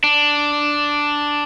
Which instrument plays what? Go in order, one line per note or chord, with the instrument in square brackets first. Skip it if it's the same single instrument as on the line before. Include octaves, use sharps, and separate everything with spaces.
[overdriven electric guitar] D4